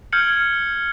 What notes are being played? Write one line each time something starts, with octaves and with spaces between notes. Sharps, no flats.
F6 G6 G#6 C#7 F#7